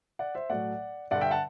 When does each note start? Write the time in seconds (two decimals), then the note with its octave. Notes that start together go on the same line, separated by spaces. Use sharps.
0.19 D5 F#5
0.35 C5 E5
0.50 A2 F#3 A3 D5 F#5
1.11 G2 D3 G3 D5 F#5
1.21 E5 G5
1.31 F#5 A5